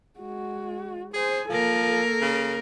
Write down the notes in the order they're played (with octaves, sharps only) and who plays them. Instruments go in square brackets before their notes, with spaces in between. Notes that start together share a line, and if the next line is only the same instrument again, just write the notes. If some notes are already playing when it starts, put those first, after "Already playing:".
[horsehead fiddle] G#3 F#4
[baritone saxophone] G#4 [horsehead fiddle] C5 G#5
[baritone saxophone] F3 [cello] A#3 A#4 [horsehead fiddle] A4
[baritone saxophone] C#3